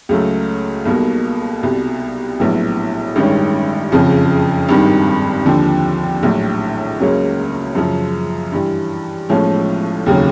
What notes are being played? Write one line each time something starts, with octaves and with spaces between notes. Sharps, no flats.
C#2 C#3 F#3 A3
B1 B2 G3 A#3
C2 B2 G3
A#1 A2 F#3 B3 E4
A1 G2 D#3 G#3 C#4
F#1 F2 C#3 F3
G#1 G2 D#3
D#2 D3 F3
A#1 A2 F#3
C#2 C#3 F#3 A#3 C#4
F#2 C#3 F3
G2 E3 G3
B1 A2 F3 G#3 C#4
F1 D#2 C#3 F#3